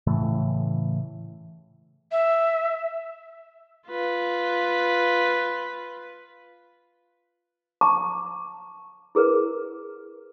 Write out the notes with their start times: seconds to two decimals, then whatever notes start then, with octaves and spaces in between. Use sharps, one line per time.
0.07 A2 C#3 E3 A3
2.12 E5
3.88 F4 B4
7.81 A5 A#5 C#6 D6
9.15 E4 G#4 A#4 B4